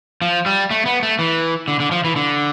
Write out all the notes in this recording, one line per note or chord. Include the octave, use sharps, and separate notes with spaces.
F3
G3
A3
B3
A3
E3
D3
D3
F3
E3
D3